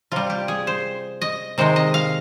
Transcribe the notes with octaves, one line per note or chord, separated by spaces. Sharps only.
C3 G3 F4
G4
G#4
C5
D#5
C3 D#3 G#3 C5
D#5
F5